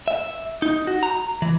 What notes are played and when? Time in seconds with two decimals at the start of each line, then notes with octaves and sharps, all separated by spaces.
0.08 E5
0.62 D#4
0.87 F#4
1.03 A#5
1.42 E3